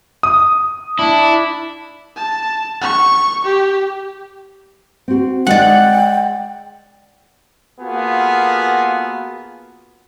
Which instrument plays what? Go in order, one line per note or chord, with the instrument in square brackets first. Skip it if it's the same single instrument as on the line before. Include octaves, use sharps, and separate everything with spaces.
[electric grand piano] D#6
[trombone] D4 [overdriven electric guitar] E4
[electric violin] A5
C#6
G4
[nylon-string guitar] C4 F#4
[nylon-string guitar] G#3 D#5 [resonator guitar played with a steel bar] D5 F#5 [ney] G5
[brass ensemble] A#3 B3 F4 F#4 G#4 A4